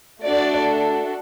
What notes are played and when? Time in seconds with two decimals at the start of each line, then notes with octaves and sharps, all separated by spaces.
0.23 A3 D4 F#4 A4 D5